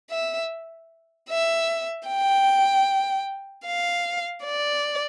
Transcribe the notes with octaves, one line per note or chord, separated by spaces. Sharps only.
E5
E5
G5
F5
D5